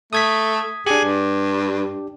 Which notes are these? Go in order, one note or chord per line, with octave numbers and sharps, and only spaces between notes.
A3 D#6 G#6 B6
D4 G4 G#4
G2